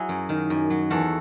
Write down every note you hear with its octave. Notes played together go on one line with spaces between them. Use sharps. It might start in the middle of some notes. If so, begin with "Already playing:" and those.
Already playing: F#3 E4 G#4
F#2
D#3
F#2
F#3
E2 F#4 A4